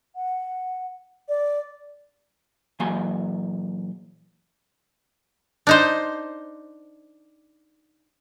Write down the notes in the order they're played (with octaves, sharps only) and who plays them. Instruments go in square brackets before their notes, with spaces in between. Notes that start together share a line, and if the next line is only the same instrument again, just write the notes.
[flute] F#5
D5
[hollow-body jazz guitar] A#2 E3 F#3 A#3 G#5 C6
[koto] D4 D#4 C5